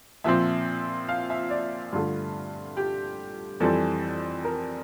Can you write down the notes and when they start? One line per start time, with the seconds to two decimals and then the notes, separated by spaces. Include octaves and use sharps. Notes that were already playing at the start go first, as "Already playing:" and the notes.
0.24 A#2 F3 C4 E5
1.09 F5
1.30 E5
1.50 D5
1.93 G2 D3 A3 F4
2.77 G4
3.60 F2 E3 G3 C4 A4
4.45 A#4